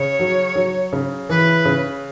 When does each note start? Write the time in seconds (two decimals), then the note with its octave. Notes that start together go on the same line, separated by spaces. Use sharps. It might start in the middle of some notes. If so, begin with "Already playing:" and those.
Already playing: C#3 C#5
0.19 F#3
0.56 F#3
0.93 C#3
1.29 E3 B4
1.65 C#3